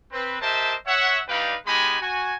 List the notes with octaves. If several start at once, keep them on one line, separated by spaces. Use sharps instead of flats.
C4 B4
G4 A#4 C5 D#5 E5 A5
C#5 E5 F#5
G3 D4 D#4 B4 F5 G5
G#3 B3 D#4 G4 G#5 B5
F#4 G#5